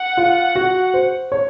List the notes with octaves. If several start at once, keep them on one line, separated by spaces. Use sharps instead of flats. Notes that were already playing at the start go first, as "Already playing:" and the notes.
Already playing: F#5
F4
F#4
C5
C#5